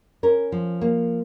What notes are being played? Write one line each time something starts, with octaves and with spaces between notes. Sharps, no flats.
C#4 A#4
F3
A#3